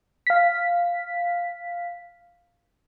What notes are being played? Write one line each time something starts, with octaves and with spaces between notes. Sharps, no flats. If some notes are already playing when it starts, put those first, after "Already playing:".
F5 B6